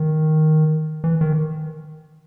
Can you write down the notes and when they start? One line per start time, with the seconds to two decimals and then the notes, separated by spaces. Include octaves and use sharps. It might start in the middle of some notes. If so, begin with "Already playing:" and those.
Already playing: D#3
1.04 E3
1.21 D#3